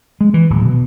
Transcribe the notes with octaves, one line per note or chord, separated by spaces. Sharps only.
G#3
E3
D1
B2